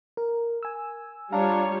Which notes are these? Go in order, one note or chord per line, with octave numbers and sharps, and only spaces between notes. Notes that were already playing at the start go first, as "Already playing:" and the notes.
A#4
G#5 E6
G3 D4 F4 C#5 F5 A#5